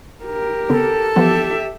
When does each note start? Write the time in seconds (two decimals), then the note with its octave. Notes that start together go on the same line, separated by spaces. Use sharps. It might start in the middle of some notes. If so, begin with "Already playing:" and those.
0.25 G4 A#4
0.69 C#3 B3 C4 A4
1.16 E3 F3 B3 G4 E5